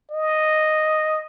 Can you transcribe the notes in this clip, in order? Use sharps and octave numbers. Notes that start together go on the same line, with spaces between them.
D#5